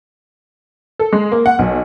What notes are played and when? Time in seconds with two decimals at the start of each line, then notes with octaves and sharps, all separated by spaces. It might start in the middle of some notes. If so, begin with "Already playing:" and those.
1.00 A4
1.13 G#3
1.32 A#3
1.46 F#5
1.59 B1